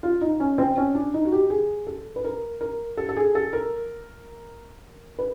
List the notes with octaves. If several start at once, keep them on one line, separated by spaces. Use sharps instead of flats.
F4
D#4
C#4
C4
C#4
D4
D#4
F#4
G4
G#4
A4
B4
A#4
A#4
A4
A4
G#4
A4
A#4
B4